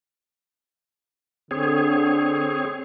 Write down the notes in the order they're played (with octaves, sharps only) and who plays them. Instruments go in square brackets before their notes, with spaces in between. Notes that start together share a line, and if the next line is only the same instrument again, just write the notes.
[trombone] D3 [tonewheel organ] C4 G#4 C#5